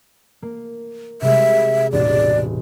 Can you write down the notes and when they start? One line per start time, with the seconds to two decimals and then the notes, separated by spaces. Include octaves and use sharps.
0.42 A#3
1.22 C3 G3 G#3 E5
1.92 E1 A1 D5